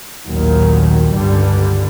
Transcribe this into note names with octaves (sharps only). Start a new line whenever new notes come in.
A1 D#2 A#2 D#3 F#3
C#2 G2 D3 G3